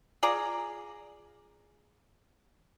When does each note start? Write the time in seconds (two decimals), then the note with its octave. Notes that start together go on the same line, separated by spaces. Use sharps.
0.23 F4 G#4 D5 A#5